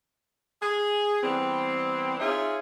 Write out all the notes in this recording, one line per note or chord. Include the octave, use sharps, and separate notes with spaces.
G#4
E3 G3 B3 C4
D#4 F4 G#4 C#5 E5